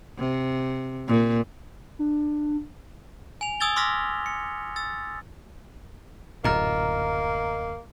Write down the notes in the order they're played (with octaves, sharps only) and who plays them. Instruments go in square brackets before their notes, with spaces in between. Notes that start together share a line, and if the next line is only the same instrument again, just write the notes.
[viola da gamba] C3
A#2
[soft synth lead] D4
[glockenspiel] G#5 F7
G#5 D#6 E6 G#6 A6 G7
C6 D6 E6 F6 A#6 B6
C#7
E6 A6
[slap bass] D1 F#2 A#2 [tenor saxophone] A#3 [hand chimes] D#5 A#5 F6